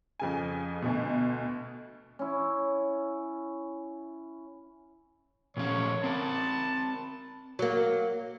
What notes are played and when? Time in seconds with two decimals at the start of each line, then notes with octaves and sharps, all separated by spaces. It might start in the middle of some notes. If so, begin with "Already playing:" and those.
0.20 F2 C#3 G#5
0.82 D2 B2
2.19 C#4 E4
5.57 A#2 F3 C#4 C#5
6.04 C4 A#4 A5
7.59 F#3 A#3